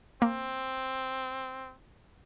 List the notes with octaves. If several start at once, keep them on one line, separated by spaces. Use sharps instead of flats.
A#3 C4